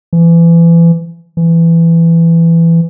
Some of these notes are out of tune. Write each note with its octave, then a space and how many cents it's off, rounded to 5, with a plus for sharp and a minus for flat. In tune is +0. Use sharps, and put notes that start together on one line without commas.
E3 +30
E3 +15